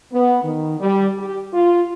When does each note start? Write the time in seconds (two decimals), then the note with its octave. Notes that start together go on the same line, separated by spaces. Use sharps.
0.13 B3
0.44 D#3
0.80 G3
1.18 G4
1.54 F4